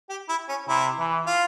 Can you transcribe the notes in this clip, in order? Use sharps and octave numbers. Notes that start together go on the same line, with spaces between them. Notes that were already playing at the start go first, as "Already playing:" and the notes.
G4
E4
C#4
C3 E4
E3
F4